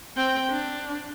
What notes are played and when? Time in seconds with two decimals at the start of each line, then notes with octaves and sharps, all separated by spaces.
0.16 C4 G5
0.50 D4